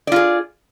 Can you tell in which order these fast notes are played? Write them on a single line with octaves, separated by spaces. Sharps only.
D5 F4 G#4